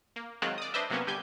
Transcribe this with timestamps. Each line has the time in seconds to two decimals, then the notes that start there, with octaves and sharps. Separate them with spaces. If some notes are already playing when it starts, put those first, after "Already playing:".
0.16 A#3
0.42 D#3 F#3 G#3 C4 F4 F#6
0.58 D5 D#6
0.74 D4 B4 C5 D#5 E5
0.90 C3 F#3 A#3 B3 C#4
1.07 D3 G3 G4 G#5 G6